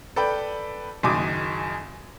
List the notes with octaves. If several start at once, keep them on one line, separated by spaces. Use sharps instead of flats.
A4 B4 D5 G5
F#1 F#2 D#3 G#5 D6 D#6